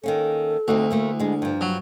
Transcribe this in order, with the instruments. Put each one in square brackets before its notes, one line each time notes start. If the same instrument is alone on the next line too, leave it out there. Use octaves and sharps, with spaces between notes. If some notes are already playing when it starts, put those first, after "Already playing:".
[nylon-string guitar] D#3 A#3 C#4 [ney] A4
[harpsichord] D2 [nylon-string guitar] C4 D#4 F#4
[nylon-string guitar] A3 A#3 E4
[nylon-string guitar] G#3 B3 [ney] D4
[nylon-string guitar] G2 F3
[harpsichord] F#3